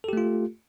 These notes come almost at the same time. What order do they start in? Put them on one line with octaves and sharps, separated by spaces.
A4 G4 A3 F4